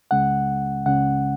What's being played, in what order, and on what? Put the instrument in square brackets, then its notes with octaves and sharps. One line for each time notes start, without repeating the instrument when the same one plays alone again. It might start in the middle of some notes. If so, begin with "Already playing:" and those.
[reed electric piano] C#2 C#3 G#3 C#4 F#5
C#2 C#3 G#3 C#4 F#5